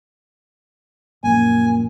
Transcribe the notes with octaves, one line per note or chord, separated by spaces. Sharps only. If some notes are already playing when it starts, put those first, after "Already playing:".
A#1 F#2 A#2 A#3 G#5